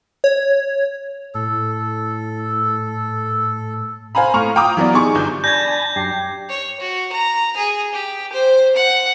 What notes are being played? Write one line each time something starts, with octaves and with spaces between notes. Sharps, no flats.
C#5
A2 A4
C5 F5 G#5 A#5 B5
A2 A#5 C#6 F6
F5 G5 A#5 D6 D#6
E3 F#3 B3 D5
D#4 G4 G#4 C#6 D6
G1 G6
D4 G#5 A5 B5 G6 G#6 A#6
F#2 D4 G4 C7
C#5
F#4
A#5
G#4
G4
C5
F#5